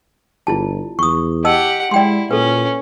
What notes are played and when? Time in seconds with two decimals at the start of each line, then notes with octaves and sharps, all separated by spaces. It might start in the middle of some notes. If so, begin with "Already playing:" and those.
0.47 G1 E4 F4 A5
0.99 E2 C#6 D#6
1.44 G4 D#5 F#5 A5 E6
1.91 G#3 E4 D5 G5 C6
2.31 A#2 C#4 A4 B4